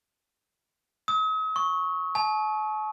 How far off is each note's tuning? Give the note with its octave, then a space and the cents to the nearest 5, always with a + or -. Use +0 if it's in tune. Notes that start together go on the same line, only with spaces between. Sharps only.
D#6 +45
C#6 -5
A5 -45